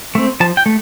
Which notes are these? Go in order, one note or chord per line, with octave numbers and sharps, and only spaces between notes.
A3 C4
F3 A5
G5
A3